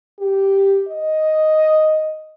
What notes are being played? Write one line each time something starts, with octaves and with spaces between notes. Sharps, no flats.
G4
D#5